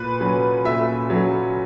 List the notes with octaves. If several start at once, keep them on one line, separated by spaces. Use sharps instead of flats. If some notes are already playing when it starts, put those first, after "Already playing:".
Already playing: A#2 B4
F#3 C#4
A#2 E5
F#3 C#4